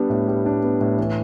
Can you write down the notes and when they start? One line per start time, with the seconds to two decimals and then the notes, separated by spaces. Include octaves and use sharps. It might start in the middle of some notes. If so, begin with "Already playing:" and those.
Already playing: G3 B3 D4
0.10 A2
0.28 G3
0.46 D4
0.63 B3
0.81 A2
0.98 E3